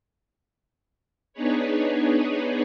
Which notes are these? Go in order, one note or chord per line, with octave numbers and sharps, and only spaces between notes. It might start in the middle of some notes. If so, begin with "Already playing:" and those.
B3 D4 D#4 G#4 B4 C#5